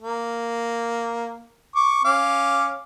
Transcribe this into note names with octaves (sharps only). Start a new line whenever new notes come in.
A#3
C#6 D6
C#4 F5 D6